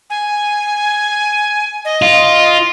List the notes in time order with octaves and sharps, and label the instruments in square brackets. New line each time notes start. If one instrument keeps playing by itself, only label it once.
[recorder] G#5
D#5
[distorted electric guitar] F4